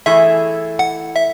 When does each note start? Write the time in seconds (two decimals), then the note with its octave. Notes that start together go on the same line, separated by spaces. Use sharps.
0.06 E3 A3 E4 G#4 E5
0.79 F#5
1.15 E5